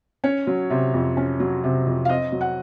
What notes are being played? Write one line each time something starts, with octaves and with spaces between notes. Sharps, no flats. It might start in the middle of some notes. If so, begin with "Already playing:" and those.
C#4 C#5
F#3
C3
F2
C#4
F#3
C3
F2
F5
C4 D#5
F#3
F#5